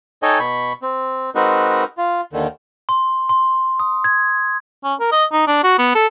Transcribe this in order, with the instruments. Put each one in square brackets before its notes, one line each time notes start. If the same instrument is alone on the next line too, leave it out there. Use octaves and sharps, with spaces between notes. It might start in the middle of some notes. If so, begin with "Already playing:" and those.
[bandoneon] D#4 A4 C#5 D#5 G5 G#5
B2 B5 C#6
C4
G#3 C4 D#4 F#4 A#4 B4
F4
D#2 D3 D#3
[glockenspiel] C6
C6
D#6
G#6
[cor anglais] C#4
A#4
D#5
D#4
D4
F#4
B3
A4